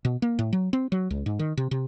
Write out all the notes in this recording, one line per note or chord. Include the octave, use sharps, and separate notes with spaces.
B2
A#3
A2
F#3
C4
F#3
C#2
G#2
D#3
C3
C3